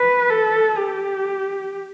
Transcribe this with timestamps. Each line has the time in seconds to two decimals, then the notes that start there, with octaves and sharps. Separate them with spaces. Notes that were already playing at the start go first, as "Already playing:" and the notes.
Already playing: B4
0.30 A4
0.77 G4